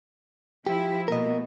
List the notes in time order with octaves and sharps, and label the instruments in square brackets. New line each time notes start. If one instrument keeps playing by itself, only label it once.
[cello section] F3 E4 [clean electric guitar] G4
[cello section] B2 A3 A#3 [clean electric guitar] A#4 D#5